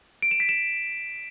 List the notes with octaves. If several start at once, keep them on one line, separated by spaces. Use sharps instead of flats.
D7
E7
B6
E7